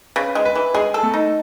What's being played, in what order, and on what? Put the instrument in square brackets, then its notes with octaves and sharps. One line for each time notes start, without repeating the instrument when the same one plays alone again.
[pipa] C#3 [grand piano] B4
[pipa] G#3
[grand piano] B4
[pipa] E3
[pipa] G#3 [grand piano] G#4
[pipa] A4
[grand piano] A3
[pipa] D#4